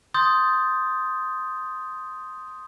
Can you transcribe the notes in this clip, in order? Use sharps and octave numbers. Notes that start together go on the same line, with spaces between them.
C6 D#6 G6 A6